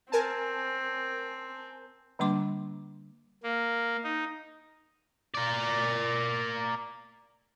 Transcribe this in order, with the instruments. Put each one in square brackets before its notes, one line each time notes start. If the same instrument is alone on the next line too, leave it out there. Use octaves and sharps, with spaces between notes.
[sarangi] C4 [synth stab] A#4 G#5 A5
[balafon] D3 G3 A#3 D4 C6 D6
[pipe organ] A#3
D#4
[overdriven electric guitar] A#4 D5